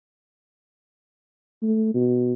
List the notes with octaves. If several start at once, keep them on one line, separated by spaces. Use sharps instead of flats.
A3
B2